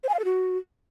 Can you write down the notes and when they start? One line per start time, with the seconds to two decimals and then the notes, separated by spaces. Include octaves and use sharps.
0.04 C5
0.09 G#5
0.14 F5
0.19 A4
0.25 F#4